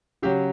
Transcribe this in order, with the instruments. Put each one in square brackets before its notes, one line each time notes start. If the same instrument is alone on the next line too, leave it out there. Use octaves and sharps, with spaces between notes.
[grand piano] C#3 F#3 G4